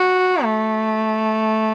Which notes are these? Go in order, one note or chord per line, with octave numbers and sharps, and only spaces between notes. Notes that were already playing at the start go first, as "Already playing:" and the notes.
Already playing: F#4
A3